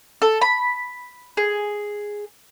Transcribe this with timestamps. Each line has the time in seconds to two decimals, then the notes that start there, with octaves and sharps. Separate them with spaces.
0.22 A4
0.41 B5
1.37 G#4